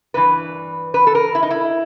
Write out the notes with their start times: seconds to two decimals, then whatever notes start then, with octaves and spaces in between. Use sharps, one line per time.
0.14 G2 E3 B4
0.94 B4
1.07 A4
1.15 A#4
1.35 E4
1.43 D#4
1.51 E4